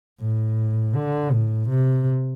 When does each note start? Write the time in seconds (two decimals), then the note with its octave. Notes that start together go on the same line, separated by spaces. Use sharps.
0.20 A2
0.95 D3
1.33 A2
1.69 C3